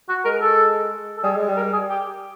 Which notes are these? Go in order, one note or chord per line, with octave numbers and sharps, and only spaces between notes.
F#4
G#3 A#4
A4
A4
G3 G#4
G#3
G3
A#4
G#4
G4